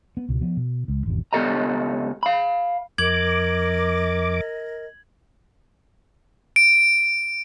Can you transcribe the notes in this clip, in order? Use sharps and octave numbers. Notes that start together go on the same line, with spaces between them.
B3
C#2 B2
F3 B3
B2
C#2
G#1 E2 B2
C#2 B3 G4 A4 D#5 A#5
F5 B5
F2 A#4 D#5 D6 G#6 F#7
D7